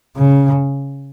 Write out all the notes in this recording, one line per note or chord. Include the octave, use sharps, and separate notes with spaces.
C#3